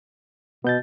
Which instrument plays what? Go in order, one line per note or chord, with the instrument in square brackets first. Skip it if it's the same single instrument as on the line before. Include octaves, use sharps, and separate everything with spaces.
[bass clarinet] B2 [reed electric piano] B3 G6 A6